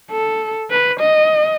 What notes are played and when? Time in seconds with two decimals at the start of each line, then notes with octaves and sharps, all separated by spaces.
0.11 A4
0.70 B4
1.00 D#5